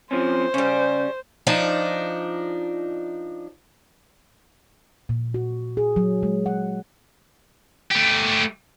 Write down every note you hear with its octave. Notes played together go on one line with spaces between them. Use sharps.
F3 C4 C#4 C5
C#3 G3 C#4
F3 D4 D#4
A#2
F#4
G#4
F#3
G#3
F#5
A3 G4